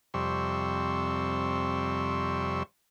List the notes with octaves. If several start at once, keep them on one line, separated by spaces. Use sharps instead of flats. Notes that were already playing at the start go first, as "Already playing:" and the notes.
F2 C3 G3 C6 C#6 E6